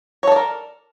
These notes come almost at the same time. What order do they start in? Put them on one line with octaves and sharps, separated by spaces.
C#5 A4 D5 A#4